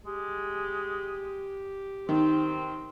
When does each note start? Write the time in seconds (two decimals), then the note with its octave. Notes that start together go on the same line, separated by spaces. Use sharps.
0.06 G#3 G4
2.09 D#3 C4